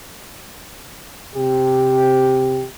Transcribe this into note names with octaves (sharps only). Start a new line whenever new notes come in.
C3 G4